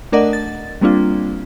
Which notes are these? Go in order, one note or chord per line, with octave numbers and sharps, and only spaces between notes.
A3 D4 A#4 D5 D#5 F#5
A6
G3 A#3 C4 D4 F4